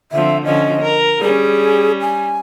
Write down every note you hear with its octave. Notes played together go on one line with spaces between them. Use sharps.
D3 F3 C4 E5
D3 F3 C#4 D#5
A#4
G3 C#4 G#4
G#5